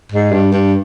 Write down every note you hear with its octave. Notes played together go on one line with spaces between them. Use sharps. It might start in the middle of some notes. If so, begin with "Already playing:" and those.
G#2
G2
G2